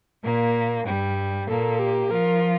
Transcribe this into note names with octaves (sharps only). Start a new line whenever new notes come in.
A#2 A#3
G2 G3
A#2 A#3 A4
G4
F3 F4 A#4